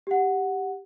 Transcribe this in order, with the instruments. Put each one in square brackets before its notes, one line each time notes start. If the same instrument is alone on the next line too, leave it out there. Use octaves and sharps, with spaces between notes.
[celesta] G4 F#5